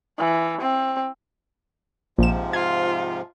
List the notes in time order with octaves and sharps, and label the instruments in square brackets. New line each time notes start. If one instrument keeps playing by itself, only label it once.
[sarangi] E3
C4
[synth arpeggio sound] A#1 E7 [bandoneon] G#2 C3 F3
[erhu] F4 [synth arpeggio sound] G#6